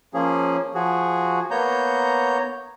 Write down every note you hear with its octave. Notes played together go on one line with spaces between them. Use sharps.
F3 A#3 C#4 G#4
F3 F#4 G#4
A#3 B3 C#5 A#5 G6